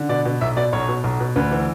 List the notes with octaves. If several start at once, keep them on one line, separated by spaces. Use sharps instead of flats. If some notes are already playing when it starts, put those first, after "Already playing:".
Already playing: D3
B2 D5
B2
B1 E5
B2 D5
B1 C#5
B2
B1
B2
D2 B4
E3